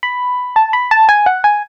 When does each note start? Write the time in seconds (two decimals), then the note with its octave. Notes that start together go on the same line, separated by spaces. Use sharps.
0.03 B5
0.56 A5
0.73 B5
0.91 A5
1.09 G#5
1.26 F#5
1.44 G#5